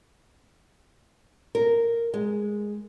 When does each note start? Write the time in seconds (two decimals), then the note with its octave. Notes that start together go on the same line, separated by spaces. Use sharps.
1.55 A#4
2.14 G#3